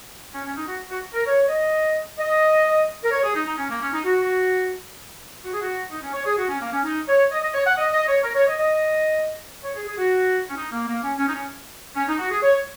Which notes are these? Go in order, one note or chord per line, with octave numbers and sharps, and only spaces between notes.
C#4
C#4
D#4
F#4
F#4
A#4
C#5
D#5
D#5
A#4
C#5
G#4
D#4
D#4
C#4
A#3
C#4
D#4
F#4
F#4
G#4
F#4
D#4
C#4
C#5
G#4
F#4
C#4
A#3
C#4
D#4
C#5
D#5
D#5
C#5
F#5
D#5
D#5
C#5
A#4
C#5
D#5
D#5
C#5
G#4
G#4
F#4
C#4
D#4
A#3
A#3
C#4
C#4
D#4
C#4
C#4
D#4
F#4
G#4
C#5